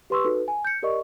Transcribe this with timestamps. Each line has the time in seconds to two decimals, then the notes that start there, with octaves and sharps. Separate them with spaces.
0.10 G4 B4 C6 C#6 E6
0.25 D#4 F#4 A4 B4
0.48 G#5
0.65 G6 C#7
0.82 G4 A#4 D5 D#5 C#6